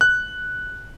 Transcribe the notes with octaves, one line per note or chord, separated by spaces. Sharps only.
F#6